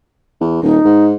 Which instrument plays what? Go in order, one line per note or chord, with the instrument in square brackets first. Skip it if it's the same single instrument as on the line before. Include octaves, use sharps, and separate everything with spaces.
[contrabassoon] E2
[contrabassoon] D#1 [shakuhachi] D#4
[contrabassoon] G#2